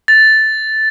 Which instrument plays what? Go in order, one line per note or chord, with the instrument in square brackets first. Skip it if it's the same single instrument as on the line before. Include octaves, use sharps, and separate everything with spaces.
[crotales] A6